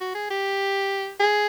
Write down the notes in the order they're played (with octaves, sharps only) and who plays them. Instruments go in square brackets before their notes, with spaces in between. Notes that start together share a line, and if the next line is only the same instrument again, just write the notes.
[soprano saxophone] F#4
G#4
G4
G#4